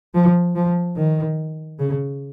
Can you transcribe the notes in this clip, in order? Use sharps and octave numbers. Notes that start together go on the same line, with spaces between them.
F3
F3
D#3
C#3